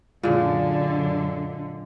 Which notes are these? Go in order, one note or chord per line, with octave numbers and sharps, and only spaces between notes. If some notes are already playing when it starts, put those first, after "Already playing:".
F#2 A#2 D3 G#3